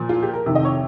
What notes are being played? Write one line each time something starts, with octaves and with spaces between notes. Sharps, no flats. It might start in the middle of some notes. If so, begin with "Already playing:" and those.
Already playing: A#2 F3
F4
G4
A#4
F2 C3 D#3
D#5
C#5